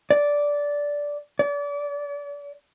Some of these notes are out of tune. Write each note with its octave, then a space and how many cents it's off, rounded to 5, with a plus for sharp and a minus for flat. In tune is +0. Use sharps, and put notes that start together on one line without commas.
D5 -10
D5 -35